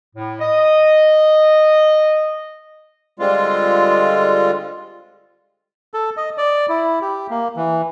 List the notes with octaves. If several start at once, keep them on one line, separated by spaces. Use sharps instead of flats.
A2
D#5
D3 G3 G#3 C4 F4
A4
D#5
D5
E4
G4
A#3
E3